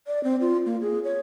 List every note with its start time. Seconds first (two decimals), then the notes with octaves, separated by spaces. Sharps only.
0.07 D5
0.24 C4
0.41 F4
0.66 A#3
0.81 G#4
1.04 C#5